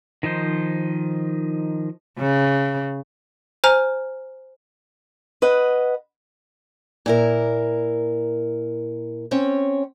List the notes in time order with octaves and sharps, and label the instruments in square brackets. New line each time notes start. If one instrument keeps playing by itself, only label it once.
[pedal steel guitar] D#3 F3 D#4 C5
[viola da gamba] C#3
[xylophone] C5 G#5 A#5 F6
[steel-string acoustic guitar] B4 D#5 F#5
A#2 E4 A#4
C4 C#4 C#5